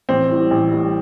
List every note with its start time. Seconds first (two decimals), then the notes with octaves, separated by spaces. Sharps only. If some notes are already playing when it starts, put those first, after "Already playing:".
0.09 A1 C4
0.30 A2 E3 G3
0.51 A1
0.71 A2 E3 G3